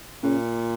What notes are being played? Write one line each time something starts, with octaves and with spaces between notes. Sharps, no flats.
A#2 C#3